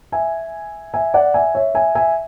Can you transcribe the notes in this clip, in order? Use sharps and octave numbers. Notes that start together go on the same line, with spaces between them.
E5 G#5
E5 G#5
D5 F#5
E5 G#5
C#5 E5
E5 G#5
E5 G#5